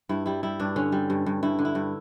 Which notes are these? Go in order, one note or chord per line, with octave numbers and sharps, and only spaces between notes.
G2 E4
G3 E4
G3 E4
G2 D4
D3 C#4
G3
G2
G2
G2 E4
D3
E4
G2